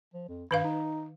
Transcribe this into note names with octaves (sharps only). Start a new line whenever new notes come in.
F3
F2
G2 D#3 B4 F5
D#4